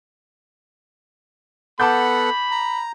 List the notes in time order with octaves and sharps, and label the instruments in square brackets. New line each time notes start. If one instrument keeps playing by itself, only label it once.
[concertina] B3 A4 F#5 [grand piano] A5 D6 G6 [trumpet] B5
[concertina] A#5